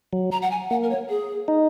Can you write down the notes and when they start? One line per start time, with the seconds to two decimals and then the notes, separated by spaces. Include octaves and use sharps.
0.13 F#3
0.32 A#5
0.42 F#5
0.51 G#5
0.71 A#3 F#5
0.83 A#4
0.90 C#5
1.09 G#4
1.48 D#4